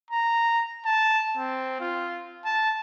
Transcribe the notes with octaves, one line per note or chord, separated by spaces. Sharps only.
A#5
A5
C4
F4
A5